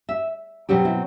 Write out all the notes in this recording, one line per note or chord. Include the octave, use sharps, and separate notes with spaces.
E5
B2 F#3 C4 G4
E4